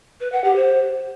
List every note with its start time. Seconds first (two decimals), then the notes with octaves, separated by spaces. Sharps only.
0.20 B4
0.32 F#5
0.44 G4
0.55 C5